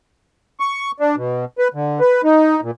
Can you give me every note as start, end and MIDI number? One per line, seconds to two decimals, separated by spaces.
0.60 0.91 85
1.00 1.16 62
1.16 1.45 47
1.58 1.68 71
1.74 2.00 50
2.00 2.22 71
2.24 2.60 63
2.63 2.71 46